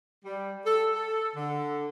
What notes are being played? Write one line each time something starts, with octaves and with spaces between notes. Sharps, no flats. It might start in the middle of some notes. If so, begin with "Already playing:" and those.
G3
A4
A4
D3